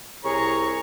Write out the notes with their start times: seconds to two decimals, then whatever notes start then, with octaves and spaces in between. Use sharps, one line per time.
0.24 C2 G#4 C#5 A#5 C#6